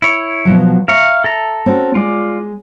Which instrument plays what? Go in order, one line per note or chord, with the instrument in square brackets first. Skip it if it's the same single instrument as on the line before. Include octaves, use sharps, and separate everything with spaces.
[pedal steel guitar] E4 C#5
[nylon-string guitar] B2 F3 F#3
[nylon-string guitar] E5 [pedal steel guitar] F5 A#5 C#6
[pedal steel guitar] A4 A5 A#5
[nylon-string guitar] C4 C#4 F#4
[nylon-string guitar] G#3 [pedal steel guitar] F4 D5